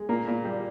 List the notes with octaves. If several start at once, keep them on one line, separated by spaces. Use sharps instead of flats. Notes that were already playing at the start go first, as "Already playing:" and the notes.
Already playing: G#3
A#2 A#3
A#2
G3